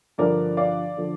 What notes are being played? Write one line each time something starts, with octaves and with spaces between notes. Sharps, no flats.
G2 D3 F3 A#4 D5
D5 F5
D3 F3